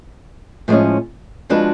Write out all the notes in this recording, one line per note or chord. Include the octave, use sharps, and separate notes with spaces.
A2 F3 G#3 C#4
F3 G#3 D4 F#4 B4